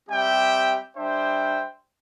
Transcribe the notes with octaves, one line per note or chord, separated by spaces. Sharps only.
G3 C4 G4 E5 G5
G3 D4 C5 E5 G5